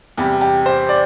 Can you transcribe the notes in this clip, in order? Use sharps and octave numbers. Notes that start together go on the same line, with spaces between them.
E2 C3 G3 G4
G4
C5
D5